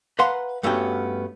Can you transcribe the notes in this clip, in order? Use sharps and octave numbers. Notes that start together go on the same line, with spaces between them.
B4 F5 F#5 A#5 C6
G2 A3 B3 C#4 F#4 G5